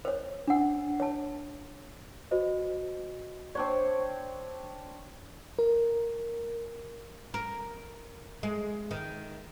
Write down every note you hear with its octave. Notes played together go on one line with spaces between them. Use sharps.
C5 C#5
D4 F#5
C#5 A5
F#4 C5 D#5
C4 D4 C#5 D5
A#4
A#4
G#3
D#3